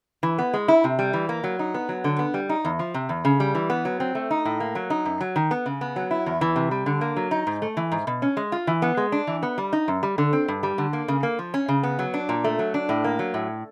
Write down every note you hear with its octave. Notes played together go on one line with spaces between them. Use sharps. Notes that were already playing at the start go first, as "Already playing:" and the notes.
E3
B3
G#3
E4
C3
G3
E3
A#3
F#3
D#4
B3
F#3
D3
B3
G3
D#4
E2
F3
C3
E2
C#3
G3
E3
B3
F#3
C4
A3
D#4
A2
A#3
F#3
D#4
F#2
F#3
D#3
B3
C#3
B3
F#3
E4
E2
E3
C3
G3
D3
A#3
F#3
D#4
G#2
A3
E3
G#2
B2
C#4
G#3
F4
E3
B3
G#3
D4
E3
B3
G3
D#4
F#2
G3
D3
C4
G2
G3
D3
A#3
C#3
A#3
F3
C#4
C#3
B3
F#3
D4
A#2
A3
F#3
D4
A2
A#3
F#3
A2